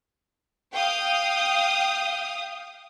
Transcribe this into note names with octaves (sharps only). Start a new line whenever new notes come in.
F5 G5 D#6